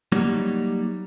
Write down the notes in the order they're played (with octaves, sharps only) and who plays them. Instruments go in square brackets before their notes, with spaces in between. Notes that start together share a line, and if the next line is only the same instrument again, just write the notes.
[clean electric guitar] F#3 G3 A#3 D#4